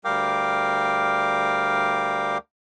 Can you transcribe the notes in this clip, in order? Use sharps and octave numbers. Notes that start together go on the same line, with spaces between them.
D2 G3 A#4 F5 G5 D6